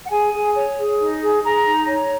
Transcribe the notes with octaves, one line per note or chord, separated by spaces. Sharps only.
F#5
G#4 G#5
G#4
C#5
G#4
D#4
G#4
G#4 A#5
D#4
C#5